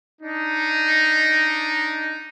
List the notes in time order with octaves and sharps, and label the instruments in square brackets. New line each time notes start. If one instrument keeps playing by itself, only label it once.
[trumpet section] D4 D#4